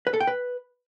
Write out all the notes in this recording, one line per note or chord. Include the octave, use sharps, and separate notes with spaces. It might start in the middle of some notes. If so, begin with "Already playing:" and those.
B4
A4
G5
B4